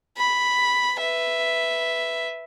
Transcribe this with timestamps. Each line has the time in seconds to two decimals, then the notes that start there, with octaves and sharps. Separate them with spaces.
0.17 B5
0.97 B4 E5